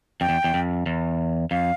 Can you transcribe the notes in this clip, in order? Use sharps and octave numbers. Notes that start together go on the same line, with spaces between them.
F2 G5
E2
E2
F2
E2
F2 F5